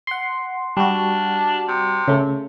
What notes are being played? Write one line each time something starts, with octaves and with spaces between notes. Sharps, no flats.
F#5 C6
G3 D4 F#4
C3
C#3 A3